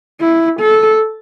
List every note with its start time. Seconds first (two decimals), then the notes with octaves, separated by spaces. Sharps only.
0.21 E4
0.60 A4